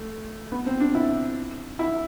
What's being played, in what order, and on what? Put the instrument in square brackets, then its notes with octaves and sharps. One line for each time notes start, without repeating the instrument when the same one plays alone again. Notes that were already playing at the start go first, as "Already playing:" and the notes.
Already playing: [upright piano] A3
B3
C4
D4
E4
E4